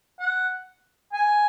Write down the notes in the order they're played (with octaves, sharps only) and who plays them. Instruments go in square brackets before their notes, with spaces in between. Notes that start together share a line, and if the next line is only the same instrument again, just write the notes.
[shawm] F#5
G#5